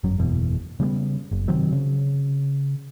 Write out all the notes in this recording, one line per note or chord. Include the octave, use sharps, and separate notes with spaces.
G1 F#2 F#3
F#1 E2 B2
C#3 G3 A3 B3
F#1
C3 D#3 F#3 C4
C#3